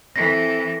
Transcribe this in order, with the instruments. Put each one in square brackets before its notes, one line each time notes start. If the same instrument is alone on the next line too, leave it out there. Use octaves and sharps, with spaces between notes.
[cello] E3 [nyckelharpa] C4 A4 [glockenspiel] A#6